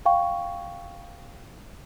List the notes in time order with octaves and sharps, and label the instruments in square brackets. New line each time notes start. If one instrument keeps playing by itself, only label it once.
[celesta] F5 G5 C#6